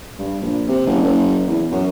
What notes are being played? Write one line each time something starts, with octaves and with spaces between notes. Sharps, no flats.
G2
A#1
C3
F#1
F#1
E2
F#2